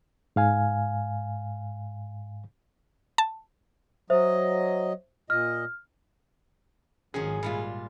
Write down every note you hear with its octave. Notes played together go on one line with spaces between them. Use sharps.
G#2 F5 G#5
A5
F#3 C5 D#5 E5
A#2 D#5 F6
G#1 D#3 F3 F#3 C#4 G#4
A#2 G3 G#3 F4